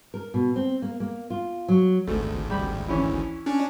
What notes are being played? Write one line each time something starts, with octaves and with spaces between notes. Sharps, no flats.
A#4
B2
C4
A#3
A#3
F4
F#3
G#1 D2 A3
G3 B5
E3 C#4 E4
C#4 D4